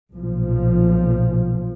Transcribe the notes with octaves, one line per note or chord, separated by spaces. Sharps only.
B1 A#2 F3